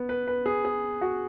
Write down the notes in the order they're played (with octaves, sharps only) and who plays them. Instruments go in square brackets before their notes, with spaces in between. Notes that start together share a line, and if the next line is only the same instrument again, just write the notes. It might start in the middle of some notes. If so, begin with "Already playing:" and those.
Already playing: [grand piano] B3
B4
B4
G#4
G#4
F#4